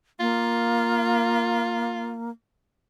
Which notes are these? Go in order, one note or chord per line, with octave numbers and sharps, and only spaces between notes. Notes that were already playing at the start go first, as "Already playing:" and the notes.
A#3 F4